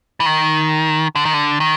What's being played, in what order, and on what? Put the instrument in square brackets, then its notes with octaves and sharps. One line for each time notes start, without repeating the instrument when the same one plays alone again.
[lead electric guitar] E3
D#3
D3
D#3
D3
D#3